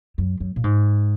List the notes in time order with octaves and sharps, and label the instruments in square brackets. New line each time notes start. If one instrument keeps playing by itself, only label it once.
[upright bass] F#2
F#2
A#2
G#2